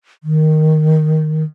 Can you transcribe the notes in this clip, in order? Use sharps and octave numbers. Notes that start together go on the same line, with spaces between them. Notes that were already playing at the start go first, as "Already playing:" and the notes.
D#3